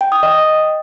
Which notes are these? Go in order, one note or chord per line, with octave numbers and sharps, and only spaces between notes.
G5
D#6
D#5